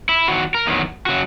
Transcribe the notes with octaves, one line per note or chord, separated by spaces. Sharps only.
E4
E2 D#3 F#3 F#4
A#4
E2 D#3 F#3
C#3 F#3 F#4